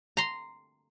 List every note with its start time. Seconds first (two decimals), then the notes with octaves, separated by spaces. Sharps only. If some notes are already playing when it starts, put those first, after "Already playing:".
0.17 A#5 C6